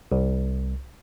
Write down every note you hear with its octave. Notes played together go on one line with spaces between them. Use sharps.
C2